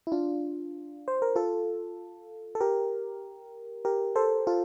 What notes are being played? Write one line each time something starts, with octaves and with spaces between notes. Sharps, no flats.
E4
D4 F4
C5
A#4
F4 A4
A4
G4 A#4
G4 A#4
A4 C5
F4 A4